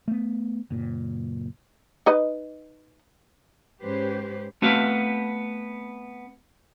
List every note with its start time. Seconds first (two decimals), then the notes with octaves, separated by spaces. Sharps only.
0.08 A3 B3
0.70 F#1 A#2
2.06 D#4 B4 D#5
3.82 G#2 C#4 G4 B4 C5
4.62 A3 B3 C4 F#4 B4 F5